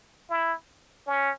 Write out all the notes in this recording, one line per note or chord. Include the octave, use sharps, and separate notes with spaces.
E4
C#4